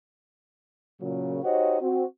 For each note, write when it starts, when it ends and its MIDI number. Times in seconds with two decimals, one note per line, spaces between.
1.01 1.39 46
1.01 1.39 49
1.01 1.39 54
1.43 1.77 63
1.43 1.77 66
1.43 1.77 67
1.43 1.77 72
1.43 1.77 73
1.43 1.77 75
1.80 2.04 60
1.80 2.04 66